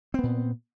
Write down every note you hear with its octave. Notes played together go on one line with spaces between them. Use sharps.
A#2 B3 C4